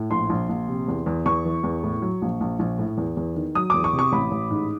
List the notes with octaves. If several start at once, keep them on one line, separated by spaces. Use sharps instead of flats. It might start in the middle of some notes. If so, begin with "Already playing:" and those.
Already playing: A2
A#1 C6
A#1
A#1
C3
E2
E2
E2 C#6
E3
E2
A2
F#3
A#1
A#1
A#1
A2
E2
E2
D#3
F#3 D#6
E2 D6
C#6
C3
C#6
A1 B5
A1
G#2